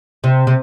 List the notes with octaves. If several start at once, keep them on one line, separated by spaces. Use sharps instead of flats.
C3
C3